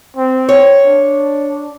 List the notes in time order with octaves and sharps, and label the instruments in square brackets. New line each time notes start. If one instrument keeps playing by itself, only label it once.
[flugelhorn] C4
[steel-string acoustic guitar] C#5
[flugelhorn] D4